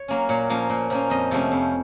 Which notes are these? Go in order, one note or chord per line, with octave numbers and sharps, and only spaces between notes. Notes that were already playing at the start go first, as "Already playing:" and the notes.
Already playing: C#5
F#3 A#3 C#4
A#2 C#5
F3 A#3 C#4
A#2
F3 A#3 C#4
F2 D#5
C3 F3 A3 C#4
F2